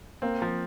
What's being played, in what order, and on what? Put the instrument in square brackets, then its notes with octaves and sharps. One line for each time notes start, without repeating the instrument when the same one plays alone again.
[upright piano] A#3 [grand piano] C4
[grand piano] F3